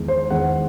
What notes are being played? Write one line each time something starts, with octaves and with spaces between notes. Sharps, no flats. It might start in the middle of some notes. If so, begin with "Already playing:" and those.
Already playing: E2 D#3 G#3
C5
E2 D#3 G#3 F#5